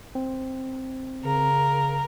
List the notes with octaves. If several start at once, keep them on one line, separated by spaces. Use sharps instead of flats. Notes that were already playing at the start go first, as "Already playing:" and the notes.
C4
C#3 A#4